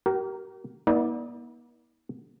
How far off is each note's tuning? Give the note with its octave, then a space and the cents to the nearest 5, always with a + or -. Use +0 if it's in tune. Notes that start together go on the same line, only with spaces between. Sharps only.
G4 -40 A#4 +0
B3 -45 D#4 +45 D5 +0